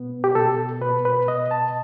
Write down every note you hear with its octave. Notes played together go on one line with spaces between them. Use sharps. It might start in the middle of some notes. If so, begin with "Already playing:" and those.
Already playing: B2 B3
G4
B2 A4
B2 B4
B4
B2 D#5
A5